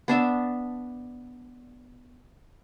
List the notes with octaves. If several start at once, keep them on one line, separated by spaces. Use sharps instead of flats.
B3 D4 E5 A5